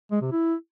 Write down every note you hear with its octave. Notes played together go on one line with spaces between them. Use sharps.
G#3
C3
E4